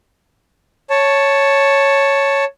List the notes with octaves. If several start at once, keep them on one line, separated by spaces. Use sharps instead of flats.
C#5 A5